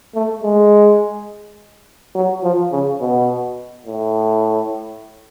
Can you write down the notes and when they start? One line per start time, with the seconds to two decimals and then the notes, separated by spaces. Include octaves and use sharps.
0.15 A3
0.43 G#3
2.15 F#3
2.43 F3
2.72 C#3
3.01 B2
3.86 A2